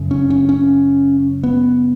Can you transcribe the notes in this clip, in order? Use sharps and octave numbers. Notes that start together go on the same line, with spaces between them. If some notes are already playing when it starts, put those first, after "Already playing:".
Already playing: F#2 C#3
C#4
C#4
C#4
B3